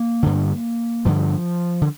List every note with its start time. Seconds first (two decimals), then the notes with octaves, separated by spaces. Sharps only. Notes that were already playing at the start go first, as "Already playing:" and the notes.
Already playing: A#3
0.23 G2 D3
1.05 G2 D3 F3
1.81 D3